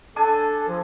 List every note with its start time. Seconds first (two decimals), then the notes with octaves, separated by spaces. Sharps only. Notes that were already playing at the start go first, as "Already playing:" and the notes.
0.16 D4 A4 G#5
0.68 F3